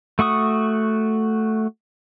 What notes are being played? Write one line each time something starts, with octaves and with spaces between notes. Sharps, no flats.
A3 F#4 C#6 D#6